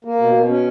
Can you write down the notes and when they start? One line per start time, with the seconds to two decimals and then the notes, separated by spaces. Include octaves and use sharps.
0.05 A#3
0.19 B2
0.34 B2
0.49 C#4